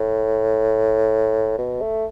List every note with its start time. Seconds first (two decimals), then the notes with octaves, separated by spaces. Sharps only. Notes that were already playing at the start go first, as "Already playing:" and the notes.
Already playing: A2
1.58 B2
1.81 A3